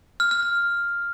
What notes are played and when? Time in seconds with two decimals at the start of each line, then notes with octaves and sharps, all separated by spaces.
0.20 F6
0.31 F6
0.43 F6